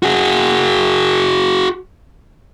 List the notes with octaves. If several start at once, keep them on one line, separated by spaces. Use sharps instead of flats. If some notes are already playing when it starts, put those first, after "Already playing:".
F#4 G#4